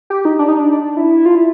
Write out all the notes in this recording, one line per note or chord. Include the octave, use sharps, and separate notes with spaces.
G4
D#4
D4
D#4
D4
E4
F4
E4